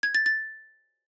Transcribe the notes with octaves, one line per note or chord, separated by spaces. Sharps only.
G#6
A6
A6